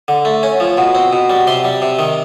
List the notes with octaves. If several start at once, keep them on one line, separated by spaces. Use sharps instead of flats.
D3
A3
C#4
F3
B2
C4
B2
G3
C3 C6
G3
C3
D#3